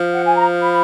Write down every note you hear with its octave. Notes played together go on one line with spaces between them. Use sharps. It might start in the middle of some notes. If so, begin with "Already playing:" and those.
Already playing: F3
F#5
G#5
A#5
B5